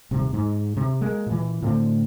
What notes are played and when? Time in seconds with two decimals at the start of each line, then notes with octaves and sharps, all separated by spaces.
0.11 D#1 C3
0.33 G#2
0.77 C3
1.01 G#3 A#3
1.27 A#2 E3
1.62 A2 D3 C4